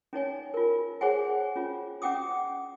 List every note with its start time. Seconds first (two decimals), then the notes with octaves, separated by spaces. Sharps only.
0.13 C#4 D#4 C#5 G#5
0.54 F4 A#4
1.01 G#4 C5 C#5 F#5 G#5
1.56 C#4 F4
2.02 C#4 F#5 G5 D6 D#6